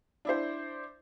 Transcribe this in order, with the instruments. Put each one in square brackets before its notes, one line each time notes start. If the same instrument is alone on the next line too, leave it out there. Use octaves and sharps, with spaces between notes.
[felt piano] D4 E4 C5